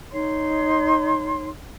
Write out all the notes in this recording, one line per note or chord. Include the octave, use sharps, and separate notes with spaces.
D#4 C#5 C6